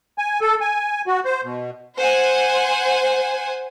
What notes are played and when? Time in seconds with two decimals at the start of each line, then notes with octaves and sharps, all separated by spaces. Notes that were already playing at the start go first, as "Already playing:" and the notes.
0.18 G#5
0.41 A4
0.61 G#5
1.07 F#4
1.25 C5
1.44 B2
1.98 C5 F#5 G#5